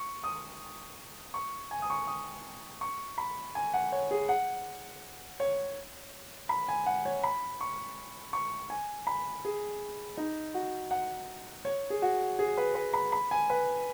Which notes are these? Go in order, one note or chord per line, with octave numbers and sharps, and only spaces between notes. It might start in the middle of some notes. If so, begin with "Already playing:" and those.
Already playing: C#6
D#6
C#6
G#5
D#6
C#6
D#6
C#6
B5
G#5
F#5
C#5
G#4
F#5
C#5
B5
G#5
F#5
C#5
B5
C#6
C#6
G#5
B5
G#4
D#4
F#4
F#5
C#5
G#4
F#4
G#4
B4
B4
B5
B5
G#5
B4